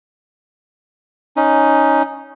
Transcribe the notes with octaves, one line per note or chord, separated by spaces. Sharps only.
C#4 D#4